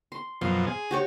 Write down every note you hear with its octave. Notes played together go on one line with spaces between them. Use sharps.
C6
F#2 B2 F3 C6
G#4
F#4 G4 C#5